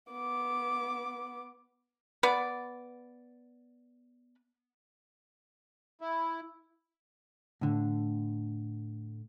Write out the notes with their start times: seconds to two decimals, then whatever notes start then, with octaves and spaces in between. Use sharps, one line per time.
0.12 B3 D6
2.23 B3 D5
6.01 E4
7.61 A2 D3